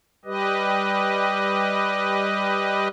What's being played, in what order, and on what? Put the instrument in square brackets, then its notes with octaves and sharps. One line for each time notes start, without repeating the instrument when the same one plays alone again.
[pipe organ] G3 G4 B4 D#5